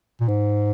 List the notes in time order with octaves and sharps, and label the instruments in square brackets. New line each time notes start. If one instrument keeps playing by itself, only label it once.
[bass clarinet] A#2
G#2